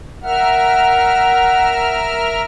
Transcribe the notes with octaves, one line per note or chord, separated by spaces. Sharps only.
A#4 E5 F#5 F6